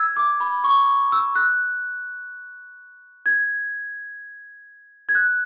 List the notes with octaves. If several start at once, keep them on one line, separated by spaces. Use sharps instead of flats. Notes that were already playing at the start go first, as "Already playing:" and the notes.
Already playing: E6 G#6
D6
B5
C#6
E6
F#6
G#6
G#6
F#6